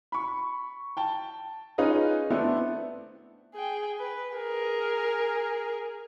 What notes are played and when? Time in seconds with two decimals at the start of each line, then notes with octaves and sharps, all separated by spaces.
0.12 B5 C#6
0.97 G5 A5 G7
1.78 C#4 D#4 F4 G#4 B4 D#5
2.30 A3 B3 C4 D4 E4 A4
3.54 G#4 G5
3.99 B4
4.34 G#4 A#4